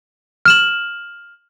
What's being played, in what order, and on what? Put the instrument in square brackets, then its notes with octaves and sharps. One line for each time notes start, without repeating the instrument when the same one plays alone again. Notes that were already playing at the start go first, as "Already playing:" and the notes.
[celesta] F6 E7 F#7